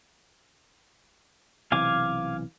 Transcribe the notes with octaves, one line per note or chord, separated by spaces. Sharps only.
B1 C3 E3 F5 G#5 D6